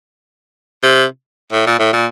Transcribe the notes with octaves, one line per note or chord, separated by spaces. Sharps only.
C3
A2
A#2
A2
A#2